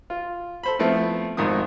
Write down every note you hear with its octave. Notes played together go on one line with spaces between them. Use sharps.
F4
A4 C5 B5
F3 A3 B3 C4 E4
G#1 F2 D#3 D#6